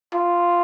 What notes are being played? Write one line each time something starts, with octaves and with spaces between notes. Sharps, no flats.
F4